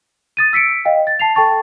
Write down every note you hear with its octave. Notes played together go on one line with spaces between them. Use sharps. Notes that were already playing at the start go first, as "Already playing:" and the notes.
D#6 A6 D#7
E6 B6 C#7 D7
D#5 F5 G5
A6
A5 C7 F7
A4 G5 A5 C#6 A6